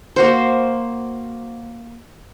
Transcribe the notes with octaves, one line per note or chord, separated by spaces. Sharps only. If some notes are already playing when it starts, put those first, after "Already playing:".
A#3 F#4 C5